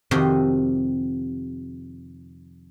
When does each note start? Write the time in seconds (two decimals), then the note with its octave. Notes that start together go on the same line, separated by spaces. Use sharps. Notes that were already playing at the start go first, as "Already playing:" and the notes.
0.11 F2 C3 D#3 F#4 D#5 C6